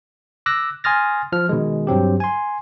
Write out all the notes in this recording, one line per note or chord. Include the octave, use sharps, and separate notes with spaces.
D6 E6 F#6 A#6
G#5 C6 D#6 F6 A6 A#6
F3 F6
B2 D#3 G#3
G2 F#3 C4 G4
G#5 C6